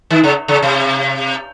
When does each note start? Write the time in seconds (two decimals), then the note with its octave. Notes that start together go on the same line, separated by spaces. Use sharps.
0.10 D#3
0.24 C#3
0.48 C#3
0.63 C3